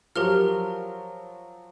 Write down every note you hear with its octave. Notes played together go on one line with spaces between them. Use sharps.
F3 F#3 G4 A#4 F6